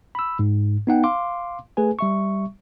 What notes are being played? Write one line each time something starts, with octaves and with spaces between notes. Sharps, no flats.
B5 E6
G#2
B3 D#4 F#5 G5
F5 C6 D6
A3 G#4 B4 G#5
G3 E5 C#6